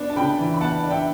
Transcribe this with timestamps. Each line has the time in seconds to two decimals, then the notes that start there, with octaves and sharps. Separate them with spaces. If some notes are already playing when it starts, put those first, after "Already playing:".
Already playing: B3 D4
0.10 A5
0.16 C#3 G5 B5
0.39 E3
0.54 B5
0.61 B3 F#5 A5
0.84 D4
0.90 E5 G5